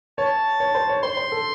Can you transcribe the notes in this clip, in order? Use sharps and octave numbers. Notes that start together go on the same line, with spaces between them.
C#5 A5
C#5
C5
C#5
C5 C6
C5
A4